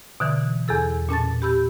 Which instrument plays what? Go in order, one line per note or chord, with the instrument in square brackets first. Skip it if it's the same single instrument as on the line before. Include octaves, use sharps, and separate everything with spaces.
[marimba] B2 D3 E3
E2 G#4 A4 E6
A#2 C#4 A5 A6
G4 B5 E6 G6